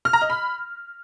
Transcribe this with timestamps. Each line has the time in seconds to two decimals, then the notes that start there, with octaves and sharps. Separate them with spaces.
0.05 F6
0.13 A#5
0.22 D#5
0.30 B5